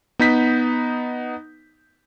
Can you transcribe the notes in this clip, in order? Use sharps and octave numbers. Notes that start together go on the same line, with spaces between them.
B3 D#4 G6 B6